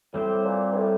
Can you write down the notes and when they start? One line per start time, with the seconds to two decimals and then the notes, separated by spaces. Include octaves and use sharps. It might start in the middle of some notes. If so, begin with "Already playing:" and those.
0.13 A2 G3 C4 G4 C5
0.45 A#2
0.72 G2
0.76 A2